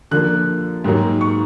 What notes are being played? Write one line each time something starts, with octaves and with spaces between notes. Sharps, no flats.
D3 F3 A#3 F#6
G#2 D#3 F#3 A#3
C#6